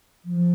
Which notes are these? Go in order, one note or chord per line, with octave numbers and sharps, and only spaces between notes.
F3